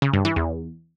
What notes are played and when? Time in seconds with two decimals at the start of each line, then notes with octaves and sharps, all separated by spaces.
0.02 C#3
0.13 G2
0.25 E3
0.36 E2